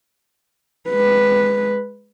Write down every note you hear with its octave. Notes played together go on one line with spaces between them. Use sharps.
G#3 B4